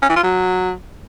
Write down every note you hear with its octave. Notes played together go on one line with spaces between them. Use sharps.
C#4
E3
F4
F#3